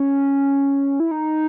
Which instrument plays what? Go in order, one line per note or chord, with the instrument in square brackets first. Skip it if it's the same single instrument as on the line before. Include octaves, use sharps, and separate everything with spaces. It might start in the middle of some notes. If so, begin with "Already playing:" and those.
Already playing: [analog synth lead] C#4
E4
D#4